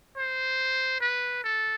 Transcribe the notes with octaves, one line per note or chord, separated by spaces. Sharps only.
C5
B4
A4